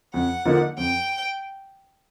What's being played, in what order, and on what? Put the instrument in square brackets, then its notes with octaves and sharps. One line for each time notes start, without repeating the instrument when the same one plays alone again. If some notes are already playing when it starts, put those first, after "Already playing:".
[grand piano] F2 [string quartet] F#5
[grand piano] D3 F3 A#3 D#4
[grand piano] F2 [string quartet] G5